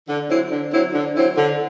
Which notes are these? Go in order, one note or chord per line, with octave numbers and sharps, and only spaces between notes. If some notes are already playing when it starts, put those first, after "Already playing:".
D3
F#3 C4 E4
D3
F#3 C4 E4
D3
F#3 C4 E4
D3